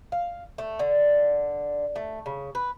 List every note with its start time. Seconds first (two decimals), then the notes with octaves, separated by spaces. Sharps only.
0.12 F5
0.58 A3
0.79 D3
1.96 A3
2.26 C#3
2.55 B4